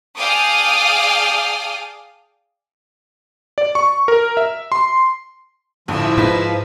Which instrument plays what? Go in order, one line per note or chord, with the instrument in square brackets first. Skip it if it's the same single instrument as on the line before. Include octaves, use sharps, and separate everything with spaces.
[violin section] G#4 D5 F5 G5 A5 D#6
[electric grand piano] D5
C#6
A#4
E5
C6
[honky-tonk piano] A1 D2 G2 [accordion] F3 [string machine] E4 E5 E6
[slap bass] G#2 [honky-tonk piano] D#4 B4